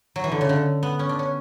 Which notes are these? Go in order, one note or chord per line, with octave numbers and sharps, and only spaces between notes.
F#3
E3
D3
C#3
D3
B3
C#4
D4
C#4